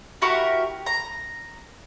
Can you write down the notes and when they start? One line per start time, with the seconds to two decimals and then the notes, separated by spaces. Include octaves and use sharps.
0.22 E4 F#4 G4 A#4
0.86 A#5